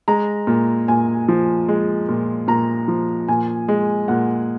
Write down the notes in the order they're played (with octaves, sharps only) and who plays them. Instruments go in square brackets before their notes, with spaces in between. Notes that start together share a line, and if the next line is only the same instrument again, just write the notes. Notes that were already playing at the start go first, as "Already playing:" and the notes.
[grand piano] G#3 A#5
A#2
A#2 G#5
F3
G#3
A#2
A#2 A#5
F3
A#2 G#5
G#3
A#2 F#5